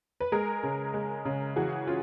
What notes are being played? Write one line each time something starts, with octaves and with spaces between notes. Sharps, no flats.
B4
G#3 G#4 A#4
C#3
G#3
C#3
E3 F#4 G#4
C#4 F4